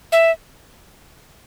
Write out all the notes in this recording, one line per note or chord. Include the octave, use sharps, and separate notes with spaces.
E5